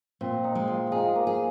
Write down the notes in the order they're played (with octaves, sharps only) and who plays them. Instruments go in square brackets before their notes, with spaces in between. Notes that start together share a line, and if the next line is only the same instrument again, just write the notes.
[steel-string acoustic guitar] A#2 [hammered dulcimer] C4
[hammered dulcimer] D#4
[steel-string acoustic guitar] G#3
[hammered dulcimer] F4
[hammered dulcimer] D#4 F4 [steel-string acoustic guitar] G#4
[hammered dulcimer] A#3
[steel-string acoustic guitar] G#4